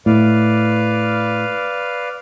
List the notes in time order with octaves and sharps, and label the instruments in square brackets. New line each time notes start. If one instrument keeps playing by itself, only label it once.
[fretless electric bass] A2 [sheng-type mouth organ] B4 D5 F5